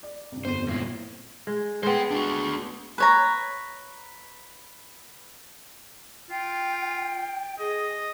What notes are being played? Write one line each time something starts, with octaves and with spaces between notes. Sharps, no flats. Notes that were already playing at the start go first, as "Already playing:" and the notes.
D5
C2 G2
G1 F2 C5 D#7
G2 A#2 E4
G#3
G#3 B3 C5 G5
D4 F#4
B4 C#5 A#5
F4 G5
G#4 D#5